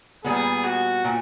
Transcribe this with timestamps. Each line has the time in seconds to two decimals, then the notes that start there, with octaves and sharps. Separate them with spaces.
0.24 A#2 G3 B3 G#4
0.64 F#4
1.04 A#2